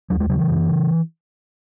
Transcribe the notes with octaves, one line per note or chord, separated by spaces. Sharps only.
D#2 F#3
G#3
C#3 F#3
E3
F#2
C#3